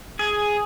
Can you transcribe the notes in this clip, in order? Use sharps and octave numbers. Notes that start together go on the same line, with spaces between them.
G#4